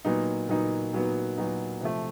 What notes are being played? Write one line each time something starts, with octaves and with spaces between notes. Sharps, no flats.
A#2 F#3 B3 D#4
A#2 F#3 B3 D#4
A#2 F#3 B3 D#4
A#2 F#3 B3 D#4
C3 F3 A3